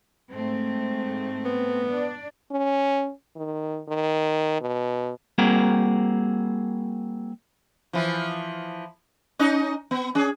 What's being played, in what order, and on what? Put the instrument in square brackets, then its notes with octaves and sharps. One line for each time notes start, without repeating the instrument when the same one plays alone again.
[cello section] G#2 A3 C4
[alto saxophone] B3
[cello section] D4 D5
[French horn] C#4
D#3
D#3
B2
[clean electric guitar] G3 A#3 C4 F#4 G#4 A#4
[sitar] E3 F3
C#4 D#4 D#5
B3
C#4 G#4